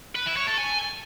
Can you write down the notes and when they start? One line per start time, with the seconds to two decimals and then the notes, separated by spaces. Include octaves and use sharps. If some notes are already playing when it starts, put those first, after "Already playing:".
0.15 B4
0.26 E4
0.36 C#5
0.47 A4
0.58 G#5